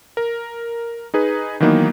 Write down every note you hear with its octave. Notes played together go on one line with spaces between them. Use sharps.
A#4
D#4 G#4 B4
D#3 E3 F#3 A#3 B3 D#4